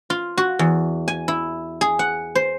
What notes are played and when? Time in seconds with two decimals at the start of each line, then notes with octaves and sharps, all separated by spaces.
0.10 F4
0.38 F#4
0.59 E2
1.08 G#5
1.28 E4
1.81 G#4
1.99 F#5
2.35 C5